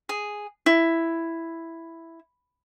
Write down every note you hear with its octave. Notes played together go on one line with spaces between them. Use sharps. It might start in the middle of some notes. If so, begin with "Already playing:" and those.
G#4
E4